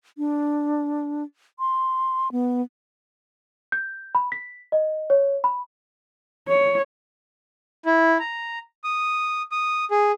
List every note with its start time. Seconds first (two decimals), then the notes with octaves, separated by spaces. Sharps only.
0.18 D4
1.59 C6
2.32 B3
3.72 G6
4.15 B5
4.32 B6
4.72 D#5
5.10 C#5
5.44 B5
6.48 C#5
7.86 E4
8.20 A#5
8.84 D#6
9.52 D#6
9.91 G#4